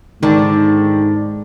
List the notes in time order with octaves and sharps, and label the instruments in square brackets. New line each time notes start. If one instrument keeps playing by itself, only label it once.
[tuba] G#2 [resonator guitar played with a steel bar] D3 D4 [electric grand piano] D#3